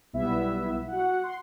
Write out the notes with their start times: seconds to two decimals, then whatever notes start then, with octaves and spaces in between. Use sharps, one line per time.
0.13 B1 G3 B3 E4 E5
0.88 F#4 F#5
1.24 C6